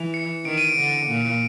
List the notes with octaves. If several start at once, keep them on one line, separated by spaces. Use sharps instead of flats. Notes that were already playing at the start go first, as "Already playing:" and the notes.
Already playing: E3
C#7
D#3 D7
D#7
D7
D3
A#2